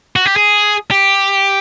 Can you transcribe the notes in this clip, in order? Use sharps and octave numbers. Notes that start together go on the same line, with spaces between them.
F#4
G4
G#4
G4